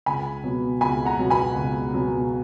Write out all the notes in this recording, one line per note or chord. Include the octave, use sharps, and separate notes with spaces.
C#2 G#5 B5
B2 F#3 B3
C#2 G#5 B5
F#5 A#5
B2 F#3 B3
G#5 B5
C#2
B2 F#3 B3